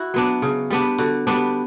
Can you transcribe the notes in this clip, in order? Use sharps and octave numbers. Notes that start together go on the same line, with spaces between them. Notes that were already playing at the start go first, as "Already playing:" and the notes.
Already playing: E4 F#4
F#3 B3 D4
C#3
G3 B3 D4
D3 F#4
G3 B3 D4